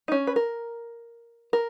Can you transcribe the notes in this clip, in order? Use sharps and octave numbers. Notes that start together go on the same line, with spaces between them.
D#4
C#4
B4
A#4
A#4